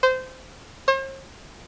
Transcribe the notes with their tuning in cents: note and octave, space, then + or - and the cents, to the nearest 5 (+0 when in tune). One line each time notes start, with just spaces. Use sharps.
C5 -20
C5 +45